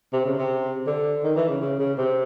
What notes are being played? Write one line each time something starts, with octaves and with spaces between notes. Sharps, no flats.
C3
C#3
C3
D3
D#3
E3
C#3
C#3
C#3
C3